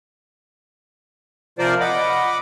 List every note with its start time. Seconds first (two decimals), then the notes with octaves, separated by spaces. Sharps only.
1.59 C3 F3 F4 A#4 C5 D5
1.80 D#5 F#5 B5 D6